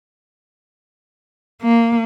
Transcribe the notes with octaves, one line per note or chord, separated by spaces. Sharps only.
A#3